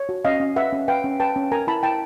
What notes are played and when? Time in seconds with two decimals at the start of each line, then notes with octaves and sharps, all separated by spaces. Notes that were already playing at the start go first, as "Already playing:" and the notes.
Already playing: C#5
0.09 F#4
0.25 C#4 D#5 F5
0.40 C#4
0.56 B4 E5 F#5
0.73 C#4
0.88 B4 F5 G5
1.04 C#4
1.20 B4 G5 A5
1.36 C#4
1.52 A#4 G#5 A#5
1.67 E4 A5 B5
1.83 E4 G5 A5